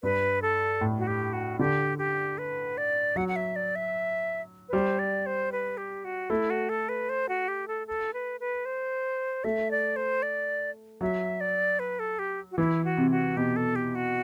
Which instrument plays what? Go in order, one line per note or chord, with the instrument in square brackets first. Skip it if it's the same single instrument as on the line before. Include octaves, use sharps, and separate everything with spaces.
[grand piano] G2 [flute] B4
[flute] A4
[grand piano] A2
[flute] F#4
G4
F#4
[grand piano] D3 [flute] G4
[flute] G4
B4
D5
[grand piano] F#3 [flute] F#5
[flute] F#5
E5
D5
E5
B4
[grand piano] G3 [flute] C5
[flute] D5
C5
B4
G4
F#4
[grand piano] A3 [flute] E4
[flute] F#4
A4
B4
C5
F#4
G4
A4
A4
B4
B4
C5
[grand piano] A3 [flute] E5
[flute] D5
C5
D5
[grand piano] F#3 [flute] E5
[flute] D5
B4
A4
G4
F#4
[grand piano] E3 [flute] E4
[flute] F#4
[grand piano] C3
[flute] F#4
[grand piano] B2 [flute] G4
[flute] A4
G4
F#4